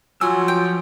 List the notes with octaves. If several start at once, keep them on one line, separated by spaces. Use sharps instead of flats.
F3 F#3 F4 G#5 E6
G5